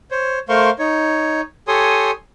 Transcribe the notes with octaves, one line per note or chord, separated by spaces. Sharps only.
C5 C#5
A3 A#4 C5 F5 C6 C#6
D#4 C#5
G4 A4 C#5 G#5 C6 D#6